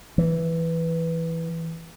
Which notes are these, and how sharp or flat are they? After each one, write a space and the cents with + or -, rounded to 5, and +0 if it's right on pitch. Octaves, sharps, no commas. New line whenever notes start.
E3 +0